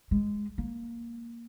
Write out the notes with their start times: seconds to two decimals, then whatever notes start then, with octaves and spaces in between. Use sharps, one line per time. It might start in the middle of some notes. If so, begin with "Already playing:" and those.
0.11 G#3
0.58 A#3